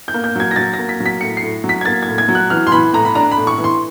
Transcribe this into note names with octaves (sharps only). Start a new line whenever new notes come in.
G6
A#3
G6
F#3 G#6
A#6
F#3 A6
A#6
A#3
B6
F#3
B6
A2 C#7
C7
A2
F#3
B6
G#6
A#3 A6
A2 G#6
G#6
F#3
F#6
E3 F6
C6
E3 B5
A2 A#5
B5
D4 A#5
B5
A2
C#6
E3
C6